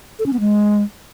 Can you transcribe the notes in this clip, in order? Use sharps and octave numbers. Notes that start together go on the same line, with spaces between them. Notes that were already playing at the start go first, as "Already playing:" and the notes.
A4
C#4
B3
G#3